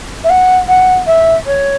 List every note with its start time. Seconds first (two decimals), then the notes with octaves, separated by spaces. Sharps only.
0.23 E5
0.29 F#5
0.68 F#5
1.06 E5
1.46 C#5